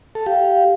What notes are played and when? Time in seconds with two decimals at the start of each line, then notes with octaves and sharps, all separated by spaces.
0.15 A4
0.26 G4 F5